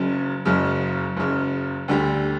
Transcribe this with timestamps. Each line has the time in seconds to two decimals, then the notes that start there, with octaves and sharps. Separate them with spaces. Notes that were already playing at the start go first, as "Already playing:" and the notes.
Already playing: F#1 F#2 C#3
0.45 F#1 F#2 C#3
1.16 F#1 F#2 C#3
1.88 D2 D3 G3